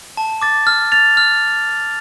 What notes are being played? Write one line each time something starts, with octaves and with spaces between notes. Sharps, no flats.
A5
D6 A6
F6
A6 F7
F6